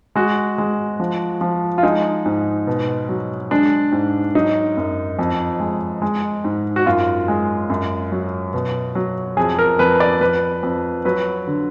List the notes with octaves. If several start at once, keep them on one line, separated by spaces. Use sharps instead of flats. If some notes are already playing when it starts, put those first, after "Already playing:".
G#3 F#4
G#3
F3
F3
F4
G#3 D#4
G#2
B2
F#3
G#3 D4
G#2
F#3 D#4
F#2
F2
G#3
G#3
G#2
F#4
F#2 F4
G#3
F#2
F#3
B2
F#3
F2 G#4
A#4
F2 B4
D5
F2 B4
F2
F#3 B4
D3